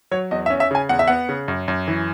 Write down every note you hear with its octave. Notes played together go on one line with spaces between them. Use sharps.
F#3 C#5
E2 D#5
E5
C#4
E5
C#3 G#5
E2 F#5
E5
B3 F#5
C#3
F#2
F#2
E3